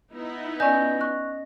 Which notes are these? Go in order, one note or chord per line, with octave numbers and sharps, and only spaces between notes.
B3 D#4 E4
C#4 D5 D#5 G#5 G6
C#6 F#6